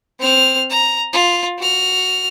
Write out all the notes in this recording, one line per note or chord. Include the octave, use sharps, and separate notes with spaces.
C4 F6
A#5
F4
F#4 F6